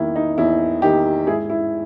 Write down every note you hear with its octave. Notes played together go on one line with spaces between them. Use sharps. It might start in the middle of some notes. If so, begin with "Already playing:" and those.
Already playing: E2 D#3 A#3 E4
D#4
E2 E4
D#3 A#3 D#4 G4
G#2 E4 G#4
E4